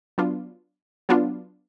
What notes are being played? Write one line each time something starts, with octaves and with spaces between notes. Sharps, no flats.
F#3 B3 D4 F4
F#3 B3 D4 F4